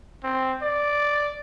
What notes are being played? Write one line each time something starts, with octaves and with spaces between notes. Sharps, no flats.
C4
D5